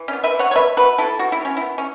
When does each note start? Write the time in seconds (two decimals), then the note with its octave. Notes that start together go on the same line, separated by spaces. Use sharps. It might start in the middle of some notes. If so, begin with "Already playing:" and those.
Already playing: E3
0.08 C#4
0.13 B3
0.24 B4 E5
0.35 E3
0.39 C#5 F#5
0.51 C#5
0.55 B3 B4 E5
0.77 B3 F#4 B4
0.98 E3 E4 A4
1.19 E3 F#4
1.32 E4
1.41 B3 C#4
1.57 B3 E4
1.78 C#4